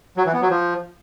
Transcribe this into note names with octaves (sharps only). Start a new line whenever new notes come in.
F#3
E3
B3
F#3
F3